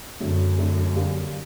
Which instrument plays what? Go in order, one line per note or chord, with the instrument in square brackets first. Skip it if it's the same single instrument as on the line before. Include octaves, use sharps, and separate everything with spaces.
[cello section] F#2 [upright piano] D3 F#3 A3
[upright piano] D3 F#3 A3
D3 G3 A#3